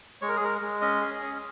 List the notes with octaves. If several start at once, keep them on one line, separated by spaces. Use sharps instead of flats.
G#3 C#5
A#4
G#4
G#3 A#4
G#3
C#4 D#5
G#4
C#4